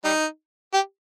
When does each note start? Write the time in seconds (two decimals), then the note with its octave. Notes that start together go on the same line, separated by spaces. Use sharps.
0.04 G3 D#4
0.74 G4